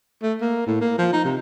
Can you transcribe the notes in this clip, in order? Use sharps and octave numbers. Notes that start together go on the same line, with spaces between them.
A3
A#3
A2
A#3
F3
D#4
C3